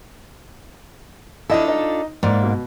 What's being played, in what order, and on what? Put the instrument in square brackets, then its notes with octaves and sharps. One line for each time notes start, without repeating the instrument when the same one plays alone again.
[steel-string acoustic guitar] D4 F4 A4 [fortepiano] E4 D#5 E5
[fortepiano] D#4
[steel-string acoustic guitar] G#2 A#3 [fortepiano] D5
[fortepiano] B2